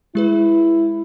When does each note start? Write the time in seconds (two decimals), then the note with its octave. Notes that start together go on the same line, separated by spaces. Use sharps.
0.15 G#3 E4 G#4 B4